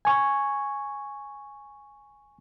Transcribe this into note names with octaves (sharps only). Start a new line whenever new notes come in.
G#5 C#6